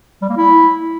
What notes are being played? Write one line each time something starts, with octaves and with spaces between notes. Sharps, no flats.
G3
A#3
E4